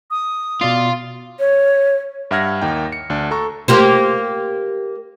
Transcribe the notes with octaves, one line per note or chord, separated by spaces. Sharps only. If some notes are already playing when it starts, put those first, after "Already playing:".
D#6
B2 F4 D5 C7
C#5
G2 E5 F#5 F6 G#6 A#6
D#2 A#3 D#4 G5
C#7
D2 D4
A4 A#5 C#6
A#3 G4 C5